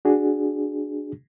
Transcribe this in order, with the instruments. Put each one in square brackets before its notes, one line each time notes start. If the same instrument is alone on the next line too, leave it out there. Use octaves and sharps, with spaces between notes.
[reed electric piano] D4 F#4 G#4